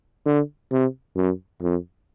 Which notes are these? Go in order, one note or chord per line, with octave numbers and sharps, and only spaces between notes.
D3
C3
F#2
F2